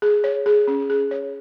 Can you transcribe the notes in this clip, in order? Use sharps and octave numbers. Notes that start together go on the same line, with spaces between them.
G#4
C#5
G#4
C#4
G#4
C#5